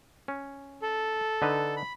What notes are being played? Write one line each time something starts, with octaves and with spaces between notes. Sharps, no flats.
C#4
A4
D3 D#4 B4
B5